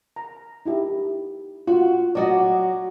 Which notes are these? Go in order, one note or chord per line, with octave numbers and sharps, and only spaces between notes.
A#5
D#4 E4 G4
F4 F#4
F#3 F#4 D5 D#5